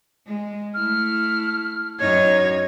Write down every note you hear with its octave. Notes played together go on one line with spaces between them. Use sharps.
G#3
A3 E4 F6
F#2 D#4 C#5 G#6